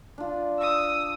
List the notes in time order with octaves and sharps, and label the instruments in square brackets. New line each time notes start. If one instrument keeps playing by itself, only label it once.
[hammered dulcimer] D4 F4
[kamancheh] D#6 E6